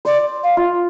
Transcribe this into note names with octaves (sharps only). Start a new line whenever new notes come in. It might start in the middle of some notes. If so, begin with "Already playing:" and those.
C5 D5
F5
F4